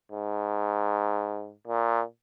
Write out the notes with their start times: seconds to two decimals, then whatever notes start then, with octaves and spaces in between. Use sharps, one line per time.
0.12 G#2
1.67 A#2